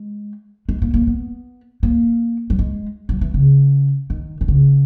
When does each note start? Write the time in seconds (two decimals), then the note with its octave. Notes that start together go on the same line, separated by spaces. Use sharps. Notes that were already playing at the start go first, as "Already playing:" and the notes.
Already playing: G#3
0.69 G#3
0.82 A#3
0.94 A#3
1.07 B3
1.83 A#3
2.50 F#3
2.59 G#3
3.09 F#3
3.21 E3
3.34 C#3
4.10 D#3
4.41 D#3
4.48 C#3